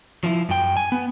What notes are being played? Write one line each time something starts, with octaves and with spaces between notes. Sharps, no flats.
F3 E4
F#2 G5
G#5
B3